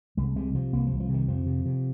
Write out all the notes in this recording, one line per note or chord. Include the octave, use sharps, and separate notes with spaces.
C2 G#3
C3 G#3
C3 F3
C2 A#3
F3
C2
F3
C3 D#3
F2 F3
C3
C3